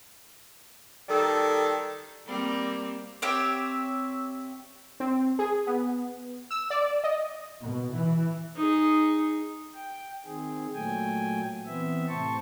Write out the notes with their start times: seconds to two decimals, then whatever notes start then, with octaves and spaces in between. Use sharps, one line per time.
1.09 D#3 G3 A4
2.27 G3 A#3 C4
3.22 C4 G4 C#5 E5
5.00 C4
5.39 G#4
5.67 B3
6.51 E6
6.70 D5
7.04 D#5
7.62 B2
7.93 E3
8.56 D#4 G#4
9.74 G5
10.25 D#3 C4 G#4
10.74 A#2 F#3 A3 G5 G#5
11.66 E3 B3 C4 E5
12.08 A2 C3 C5 A5 C#6